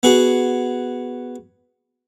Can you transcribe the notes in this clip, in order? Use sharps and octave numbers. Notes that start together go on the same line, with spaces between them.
B3 F#4 G#4